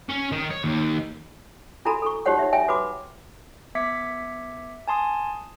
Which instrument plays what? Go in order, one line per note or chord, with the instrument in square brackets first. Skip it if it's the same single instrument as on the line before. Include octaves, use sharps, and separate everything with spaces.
[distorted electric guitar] C#4
D#3
C#5
D#2
[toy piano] D4 E4 F#4 A4 A#5 B5
A4 C#6
D#4 F#4 G4 C5 C#5 F#5
D#4 E5
C#5 E5 G5 G#5
F#4 B4 B5 D6
[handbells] B3 E5 D6 G#6 B6 C#7
G#5 A5 C6 D#6